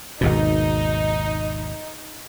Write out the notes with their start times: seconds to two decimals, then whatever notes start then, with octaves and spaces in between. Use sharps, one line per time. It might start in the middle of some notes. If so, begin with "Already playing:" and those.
0.21 G#1 D#2 B2 D#4